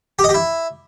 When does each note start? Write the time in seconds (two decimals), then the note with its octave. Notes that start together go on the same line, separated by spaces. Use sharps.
0.19 G4
0.24 D#5
0.29 G4
0.34 E4